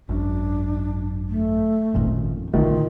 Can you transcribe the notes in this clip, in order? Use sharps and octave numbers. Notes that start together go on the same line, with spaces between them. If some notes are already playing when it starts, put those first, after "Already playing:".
G#1 F#2 D4
A3
G#1 F2 A#2 D#3 C#4
A#1 A#2 D3 D#3 A3 F4